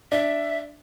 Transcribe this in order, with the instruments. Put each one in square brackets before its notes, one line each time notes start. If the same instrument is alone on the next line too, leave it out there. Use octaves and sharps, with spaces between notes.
[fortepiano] D4 [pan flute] E5